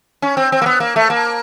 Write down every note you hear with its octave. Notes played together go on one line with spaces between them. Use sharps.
C#4
C4
C4
A#3
B3
A#3
A3
A#3